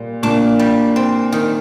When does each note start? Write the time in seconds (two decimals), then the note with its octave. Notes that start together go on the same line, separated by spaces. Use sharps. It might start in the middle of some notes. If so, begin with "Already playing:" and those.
Already playing: A#2 G3
0.23 A#2 D4
0.59 G3
0.96 C4
1.32 D#3